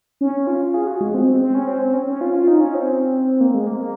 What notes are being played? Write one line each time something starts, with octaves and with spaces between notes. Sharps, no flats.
C#4
F4
G#4
F#4
G#3
C4
C4
C4
C#4
C4
C4
C#4
C#4
F4
F4
D#4
C#4
C4
A#3
G#3
A#3
A#3